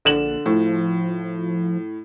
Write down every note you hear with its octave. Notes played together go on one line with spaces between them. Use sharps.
A#1 D3 E7 F#7
A2 F3